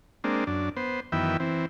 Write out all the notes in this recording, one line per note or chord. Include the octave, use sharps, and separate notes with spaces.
G#3 A#3 C4 D4
F#2 D4
B3 C5
F#2 D#3 E3 B3 E5 G5
E3 C4